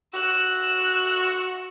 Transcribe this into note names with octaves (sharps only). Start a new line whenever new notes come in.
F#4 E6 F#6